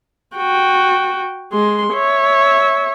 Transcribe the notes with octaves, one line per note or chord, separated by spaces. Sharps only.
F#4 G5
G#3 C6
C#5 E5